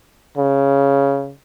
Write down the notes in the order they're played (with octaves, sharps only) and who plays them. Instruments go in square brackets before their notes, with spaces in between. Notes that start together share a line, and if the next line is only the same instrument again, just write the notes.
[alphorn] C#3